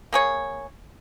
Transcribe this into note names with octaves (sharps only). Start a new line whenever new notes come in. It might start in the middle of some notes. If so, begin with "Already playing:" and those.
A#3 G#4 C#5